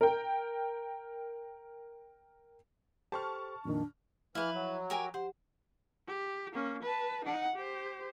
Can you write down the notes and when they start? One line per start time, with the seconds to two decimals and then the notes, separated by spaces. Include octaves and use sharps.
0.01 A#4 G5
3.12 G4 A4 C5 A5 C#6 F6
3.65 F2 A#2 D#3 D4
4.35 E3 F3 E4 B4 E5 F6
4.54 F#3
4.90 G4 A#4 G#5
5.14 G4 C5 F#5
6.08 G4
6.52 A#3 C#4
6.83 B4 A5
7.25 D#4 F#5
7.56 G4 C5